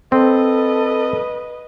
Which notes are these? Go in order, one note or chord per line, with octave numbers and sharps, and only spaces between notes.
C4 A4 B4 D#5